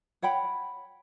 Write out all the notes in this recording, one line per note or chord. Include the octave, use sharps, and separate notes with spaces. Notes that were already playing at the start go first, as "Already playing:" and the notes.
C#5 F#5 G5 B5